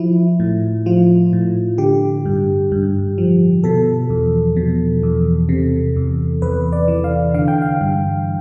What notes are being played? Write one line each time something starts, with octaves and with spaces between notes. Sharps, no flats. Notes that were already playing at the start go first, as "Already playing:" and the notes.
Already playing: F3 E4
A2
F3 F4
A2
D3 G4
G2
G2
F3
B2 A4
E2
B2
E2
C3
E2
E2 B4
D5
E3
F5
D3 F5
G5
F5
G2